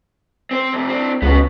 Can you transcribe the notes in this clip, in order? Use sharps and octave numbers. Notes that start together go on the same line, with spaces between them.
C4 C5
F2 C3
C4 D4
C#2 B3 F#4